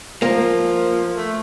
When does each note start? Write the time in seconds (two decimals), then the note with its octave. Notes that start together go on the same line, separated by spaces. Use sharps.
0.22 F3 A#3
1.16 A3